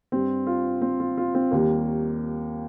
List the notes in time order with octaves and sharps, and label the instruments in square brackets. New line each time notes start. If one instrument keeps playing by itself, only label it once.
[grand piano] G2 G3 C4
F4
C4
F4
F4
C4
D#2 D#3 G3 A#3